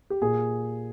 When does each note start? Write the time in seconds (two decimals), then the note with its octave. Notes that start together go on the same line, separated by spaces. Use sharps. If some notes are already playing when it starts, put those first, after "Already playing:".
0.10 G4
0.22 A#2 G#4